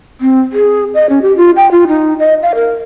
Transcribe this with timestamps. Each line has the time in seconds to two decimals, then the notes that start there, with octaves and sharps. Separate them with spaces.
0.21 C4
0.53 G#4
0.94 D#5
1.09 C#4
1.22 G4
1.37 F4
1.56 G5
1.72 F4
1.88 D#4
2.19 D#5
2.42 F5
2.55 A#4